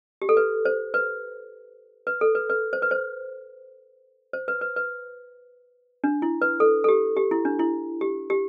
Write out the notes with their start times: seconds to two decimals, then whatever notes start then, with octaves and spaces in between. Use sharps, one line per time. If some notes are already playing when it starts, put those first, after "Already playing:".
0.22 G4
0.29 A4
0.37 B4
0.65 C5
0.94 B4
2.07 B4
2.21 A4
2.35 B4
2.50 B4
2.73 C5
2.82 B4
2.91 C5
4.33 C5
4.48 B4
4.61 B4
4.76 B4
6.04 D4
6.22 E4
6.42 B4
6.60 A4
6.84 A4
6.89 G4
7.16 G4
7.31 E4
7.45 D4
7.59 E4
8.01 G4
8.30 G4